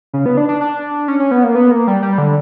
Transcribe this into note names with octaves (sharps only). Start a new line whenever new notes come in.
C#3
B3
D4
D4
D4
C#4
C#4
B3
A#3
B3
A#3
G3
G3
D3